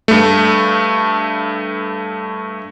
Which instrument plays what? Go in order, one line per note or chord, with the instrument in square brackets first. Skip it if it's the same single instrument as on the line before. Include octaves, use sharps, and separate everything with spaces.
[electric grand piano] G2 A3